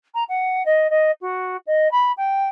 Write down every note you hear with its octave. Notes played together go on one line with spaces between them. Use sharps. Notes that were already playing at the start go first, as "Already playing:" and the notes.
A#5
F#5
D#5
D#5
F#4
D#5
B5
G5